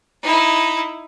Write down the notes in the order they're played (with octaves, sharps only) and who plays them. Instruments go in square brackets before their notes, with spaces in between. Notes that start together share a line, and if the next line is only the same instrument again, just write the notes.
[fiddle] D#4 E4